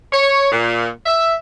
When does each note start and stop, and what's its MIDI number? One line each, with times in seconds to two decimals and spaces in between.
0.13 0.51 73
0.52 0.88 46
1.06 1.34 76